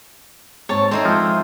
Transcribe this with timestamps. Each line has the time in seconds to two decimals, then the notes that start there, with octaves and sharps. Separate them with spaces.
0.69 G#2 C4 C#5 A5
0.91 A3 C4 D#4 E4 A4 C5
1.05 F3 G#3 E5